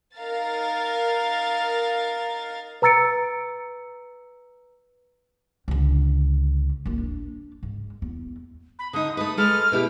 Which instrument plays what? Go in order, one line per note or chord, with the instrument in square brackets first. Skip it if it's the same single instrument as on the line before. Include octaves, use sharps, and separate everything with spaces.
[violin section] D#4 A#4 F5 A6
[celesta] B4 A#5 E6 A6 C#7 D7
[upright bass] C#2 D3
A1 D#2
D4
G#2
E2
[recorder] B5
[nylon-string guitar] D3 D#4 [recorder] D#6
[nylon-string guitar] A3 B4 [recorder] D#6
[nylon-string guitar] G#3 A4 B4 [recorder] F6
[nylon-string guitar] B2 E4 G4